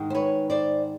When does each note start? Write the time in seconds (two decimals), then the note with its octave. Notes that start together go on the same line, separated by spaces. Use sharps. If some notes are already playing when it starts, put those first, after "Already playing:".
Already playing: G#2 D#3 G#3
0.10 C5
0.14 B4 C#5
0.50 C5 D5